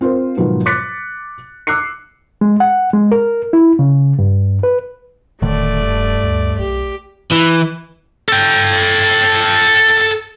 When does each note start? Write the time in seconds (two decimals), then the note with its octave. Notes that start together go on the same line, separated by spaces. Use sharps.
0.01 C4 F4 A#4 C5
0.37 G#2 B2 D#3 F3 F#3 B3
0.66 D6 F#6 A6 B6 C#7
1.67 D6 E6 F#6 C7 C#7
2.41 G#3
2.60 F#5
2.93 G#3
3.12 A#4
3.53 E4
3.79 C#3
4.19 G2
4.63 B4
5.42 E1 A2 D3 D#3 A3 D5
5.82 G2
6.24 D2
6.59 B1 G4
7.32 E3
8.28 A4 G5